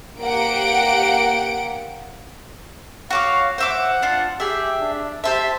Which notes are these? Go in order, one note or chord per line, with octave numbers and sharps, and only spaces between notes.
A#3 G4 F#5 D7
F#4 C#5 F5 D6
C5 E5 F#5 D6
D4 F4
G4 G#4 E5
D4
G4 C5 E5 A5